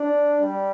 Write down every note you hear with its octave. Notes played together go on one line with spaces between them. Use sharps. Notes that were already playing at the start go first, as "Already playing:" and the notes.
Already playing: D4
G3